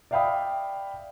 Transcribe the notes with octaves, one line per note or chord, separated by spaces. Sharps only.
D5 E5 F5 G5 B5 D#6